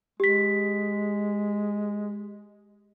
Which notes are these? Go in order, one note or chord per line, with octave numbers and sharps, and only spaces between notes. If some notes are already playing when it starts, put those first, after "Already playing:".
G#3 G4 B6